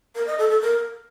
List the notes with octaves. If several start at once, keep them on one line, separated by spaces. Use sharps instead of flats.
A#4
D#5
A4
A4
A#4